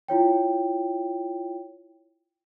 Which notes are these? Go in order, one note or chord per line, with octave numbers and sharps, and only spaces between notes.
E4 F4 C#5 G5